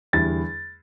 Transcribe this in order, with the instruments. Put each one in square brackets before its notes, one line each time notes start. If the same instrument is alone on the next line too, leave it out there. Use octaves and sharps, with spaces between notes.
[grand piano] E2 D3 G3 E4 [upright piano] A6